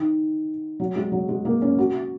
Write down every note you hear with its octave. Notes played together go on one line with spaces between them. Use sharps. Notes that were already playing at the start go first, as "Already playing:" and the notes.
Already playing: D#3
F#3
G#3
F#3
G#3
A#3
C#4
F#4